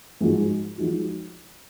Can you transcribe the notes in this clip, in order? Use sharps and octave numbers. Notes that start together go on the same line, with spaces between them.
G#2 F3 G#3 D#4 F#4
F3 G#3 D#4 F#4